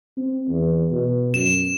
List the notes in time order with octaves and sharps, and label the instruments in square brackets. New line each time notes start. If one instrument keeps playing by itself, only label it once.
[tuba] C4
E2
B2
[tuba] F#2 [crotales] E7